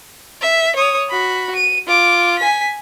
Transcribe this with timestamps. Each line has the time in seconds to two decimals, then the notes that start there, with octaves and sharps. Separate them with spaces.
0.41 E5
0.76 C#5 D#6
1.10 F#4 B5
1.56 D#7
1.87 F4 D6
2.39 G#5 B6